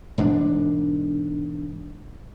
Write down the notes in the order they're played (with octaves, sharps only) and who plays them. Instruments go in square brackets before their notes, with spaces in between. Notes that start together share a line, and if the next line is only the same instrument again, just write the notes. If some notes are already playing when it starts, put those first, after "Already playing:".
[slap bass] E1 G#2 B3 D4